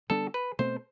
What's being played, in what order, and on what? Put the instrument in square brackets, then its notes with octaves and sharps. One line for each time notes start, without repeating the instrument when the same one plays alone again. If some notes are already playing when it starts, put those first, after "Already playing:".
[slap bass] D3 G3 B3 D4 [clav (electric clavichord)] A4
[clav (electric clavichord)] B4
[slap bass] B2 A3 C4 [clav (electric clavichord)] C5